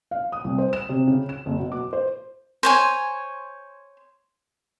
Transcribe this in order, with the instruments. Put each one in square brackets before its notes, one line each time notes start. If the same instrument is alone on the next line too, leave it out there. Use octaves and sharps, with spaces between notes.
[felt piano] F5
D#6
C2
C5
E7
C3
C#3
E7
F#1
B2
D6
C5
[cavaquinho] C5 C#5 G#5